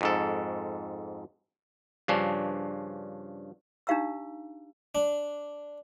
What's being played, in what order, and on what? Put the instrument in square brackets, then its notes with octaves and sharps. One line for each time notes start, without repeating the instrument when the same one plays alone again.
[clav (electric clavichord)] F2 G#2 A4
G2 C#3 F3 C#4 D4
[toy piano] D4 D#4 G4 F5 A#5 E6
[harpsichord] D4